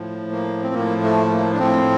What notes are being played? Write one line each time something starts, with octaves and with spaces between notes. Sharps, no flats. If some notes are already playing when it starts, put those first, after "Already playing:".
Already playing: A2 F3
A#3
C4
A2 F3 A#3
A3
A#3
D4
A2 F3 C4